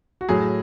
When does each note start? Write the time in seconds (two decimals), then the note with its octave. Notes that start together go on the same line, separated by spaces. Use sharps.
0.21 F#4
0.29 A2 F#3 G#4